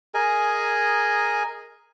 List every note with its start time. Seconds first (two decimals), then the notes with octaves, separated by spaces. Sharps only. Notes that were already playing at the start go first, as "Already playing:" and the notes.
0.14 G#4 A#4 D#5 G#5